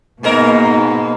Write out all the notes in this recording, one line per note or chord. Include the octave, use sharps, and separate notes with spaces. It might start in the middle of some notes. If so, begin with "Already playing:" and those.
G#2 B2 A#3 D#4 A#4